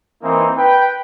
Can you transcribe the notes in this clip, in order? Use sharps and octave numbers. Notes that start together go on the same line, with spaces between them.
E3 A#3 C4 D#4
B4 G5